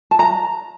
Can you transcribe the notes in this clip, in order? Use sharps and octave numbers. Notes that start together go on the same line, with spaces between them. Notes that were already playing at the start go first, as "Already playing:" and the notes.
A5
A#5